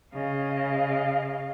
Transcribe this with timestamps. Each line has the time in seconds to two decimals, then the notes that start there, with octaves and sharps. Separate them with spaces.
0.14 C#3 D#5 F5